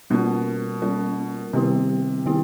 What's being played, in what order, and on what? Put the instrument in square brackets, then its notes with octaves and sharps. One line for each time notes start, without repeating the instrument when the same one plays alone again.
[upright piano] B2 [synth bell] G3 A#3 C#4 F4 A#4
[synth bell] G3 A#3 C#4 F4 A#4
[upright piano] C3 [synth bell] D#3 G3 B3 E4 G4
[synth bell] D#3 G3 B3 E4 G4